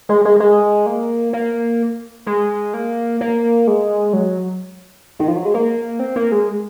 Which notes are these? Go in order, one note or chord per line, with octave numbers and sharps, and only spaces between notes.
G#3
G#3
G#3
A#3
A#3
G#3
A#3
A#3
G#3
F#3
D#3
F3
F#3
G#3
A#3
C4
A#3
G#3